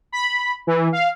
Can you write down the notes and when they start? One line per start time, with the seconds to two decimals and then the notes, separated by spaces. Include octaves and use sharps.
0.12 B5
0.67 E3
0.92 F5